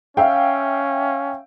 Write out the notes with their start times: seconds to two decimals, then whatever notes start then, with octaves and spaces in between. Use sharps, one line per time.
0.17 C#4 E5 F5 G5